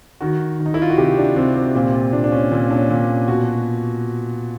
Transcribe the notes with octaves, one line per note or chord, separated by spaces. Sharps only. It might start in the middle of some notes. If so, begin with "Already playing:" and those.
D#3 F#4
D#3
D#4
E4
F4
F#4
C3 G4
D4
C3 C4
C4
A#2 C4
F4
A#2 D4
D4
C#4
A#2 C4
D4
C#4
A#2
B2 F#4